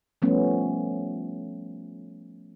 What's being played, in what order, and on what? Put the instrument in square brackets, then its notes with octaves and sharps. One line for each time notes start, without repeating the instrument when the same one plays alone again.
[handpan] F3 G3 A3 B3 C#4